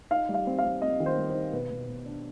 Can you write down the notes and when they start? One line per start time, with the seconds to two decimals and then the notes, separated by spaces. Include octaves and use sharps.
0.11 D#4 F5
0.29 G3
0.34 F5
0.47 C4
0.58 F5
0.64 C4
0.82 C4 D#5
1.00 D#3
1.06 C5
1.17 G3
1.30 D#4 C5
1.52 B2 B4
1.71 B2
1.88 B2
2.05 D4